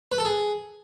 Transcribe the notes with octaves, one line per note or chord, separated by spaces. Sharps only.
B4
A4
G#4